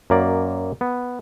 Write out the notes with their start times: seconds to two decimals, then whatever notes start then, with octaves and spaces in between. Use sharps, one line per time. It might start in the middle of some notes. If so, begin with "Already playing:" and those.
0.10 F#2 A#3 D5
0.81 B3